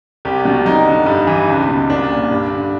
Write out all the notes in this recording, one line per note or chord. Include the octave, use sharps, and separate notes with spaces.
C2 G4
B2
F2 D#4
D3
G2
E3
C#2
B2
C2 D4
A#2
G2
D3